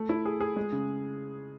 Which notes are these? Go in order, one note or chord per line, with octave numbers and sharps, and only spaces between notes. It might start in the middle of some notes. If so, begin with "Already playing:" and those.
Already playing: A3
E4
G#4
G#4
G#3
C#3